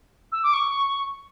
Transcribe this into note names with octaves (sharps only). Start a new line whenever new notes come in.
E6
D6
C#6